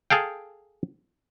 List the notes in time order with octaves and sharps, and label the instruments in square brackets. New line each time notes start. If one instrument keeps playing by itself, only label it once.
[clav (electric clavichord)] G#4 A4 F5 G5